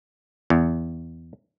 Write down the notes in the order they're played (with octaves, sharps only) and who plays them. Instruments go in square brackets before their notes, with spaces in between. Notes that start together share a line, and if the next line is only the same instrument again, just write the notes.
[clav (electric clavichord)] E2